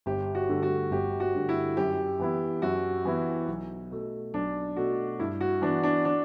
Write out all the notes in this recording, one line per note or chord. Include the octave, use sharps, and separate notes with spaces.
G1 G4
F#4
G2 D3 A3
F#4
G1 G4
F#4
G2 D3 A3
E4
F#2 G4
E3 B3 E4
F#2 F#4
E3 B3 E4
B1
B2 A3
B1 D4
B2 A3 F#4
G2 E4
F#4
E3 B3 D4
D4
D4